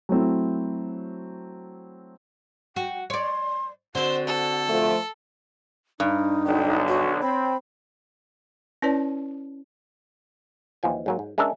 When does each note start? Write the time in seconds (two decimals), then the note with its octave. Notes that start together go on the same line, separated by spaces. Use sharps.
0.09 F#3 A3 C4 E4
2.76 F#4 G5
3.10 C#5 D5 C6
3.95 D3 C4 F#4 C5
4.27 A4
4.69 F3 A3
6.00 G2 D#4
6.46 B1 D3 G5
6.88 F#4 C#5
7.22 C4 B5
8.82 C#4 E4 B4 C#5 D5 A5
10.83 D#2 E3 F3 G#5
11.06 G#2 F#3 A#3
11.19 G#2
11.38 G#3 C#4 D4 A#4 E5